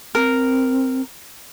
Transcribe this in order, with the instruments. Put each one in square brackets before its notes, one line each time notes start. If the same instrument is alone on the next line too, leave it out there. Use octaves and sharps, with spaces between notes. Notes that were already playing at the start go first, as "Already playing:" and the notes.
[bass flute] C4 [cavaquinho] A#4